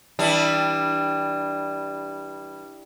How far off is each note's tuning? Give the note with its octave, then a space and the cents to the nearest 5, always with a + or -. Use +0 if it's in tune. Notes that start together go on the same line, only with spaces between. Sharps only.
E3 -25 G3 +0 D4 +0